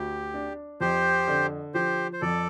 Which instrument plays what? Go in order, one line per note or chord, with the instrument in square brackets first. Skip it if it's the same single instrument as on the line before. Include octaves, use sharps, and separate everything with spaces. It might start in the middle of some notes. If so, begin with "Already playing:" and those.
Already playing: [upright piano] D2 [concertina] G4
[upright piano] D4
[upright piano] F2 [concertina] G4 C5
[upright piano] D3
[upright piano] F3 [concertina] G4 C5
[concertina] C5
[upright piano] F2 [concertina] A4 D5